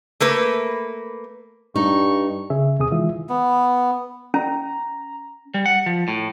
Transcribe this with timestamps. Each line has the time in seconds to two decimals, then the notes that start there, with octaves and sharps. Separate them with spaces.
0.20 A3 A#3 B4
1.76 G2 D#4 C#6
2.50 C#3 G#4 E5
2.79 D#2 C3 G#4 D#6
2.91 D#3 E3 G#3 F4 E5
3.29 B3
4.34 C#4 A#5
5.54 G3
5.66 F#5
5.86 F3
6.08 A2